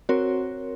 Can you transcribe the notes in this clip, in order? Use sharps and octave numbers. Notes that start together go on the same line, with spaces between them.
C4 F#4 A#4 C#5